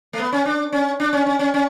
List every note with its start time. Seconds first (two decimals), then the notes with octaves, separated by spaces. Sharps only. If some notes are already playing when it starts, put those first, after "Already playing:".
0.13 A3
0.19 B3
0.32 C#4
0.45 D4
0.72 C#4
1.00 D4
1.13 C#4
1.26 C#4
1.39 C#4
1.54 C#4